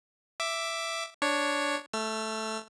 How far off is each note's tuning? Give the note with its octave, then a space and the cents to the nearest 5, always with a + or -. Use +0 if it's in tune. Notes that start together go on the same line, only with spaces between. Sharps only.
E5 +5 D6 +0
D4 -5 C#5 +0
A3 -5 E6 +45